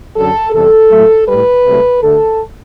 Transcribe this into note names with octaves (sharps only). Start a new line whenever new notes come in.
F#2 D3 F#3 A4
E2 C3 G3 A4
A2 F#3 A3
A2 G3 B4
C2 C3 F#3 A3
D2 D3 A3 A4